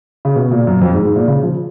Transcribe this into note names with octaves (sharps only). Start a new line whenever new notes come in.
C#3
B2
A#2
F#2
F2
G#2
G#2
A#2
C#3
F3